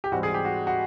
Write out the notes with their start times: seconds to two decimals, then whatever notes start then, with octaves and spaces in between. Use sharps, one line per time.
0.04 G4
0.12 G#2 E3 G3 C4 F#4
0.23 G#4
0.34 G4
0.45 F#4
0.67 F#4